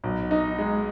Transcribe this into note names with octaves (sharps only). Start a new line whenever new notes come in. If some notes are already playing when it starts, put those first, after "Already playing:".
B1
D#4
G#3